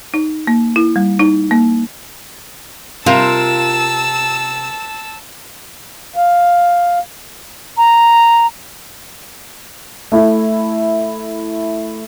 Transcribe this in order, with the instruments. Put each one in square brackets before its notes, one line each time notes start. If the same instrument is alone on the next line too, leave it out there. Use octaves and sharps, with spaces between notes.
[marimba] D#4
A#3
E4
G3
D#4
A#3
[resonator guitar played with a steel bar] C3 A#4 [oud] F4 [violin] A5 E6
[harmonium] F5
[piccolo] A#5
[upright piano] A3 E4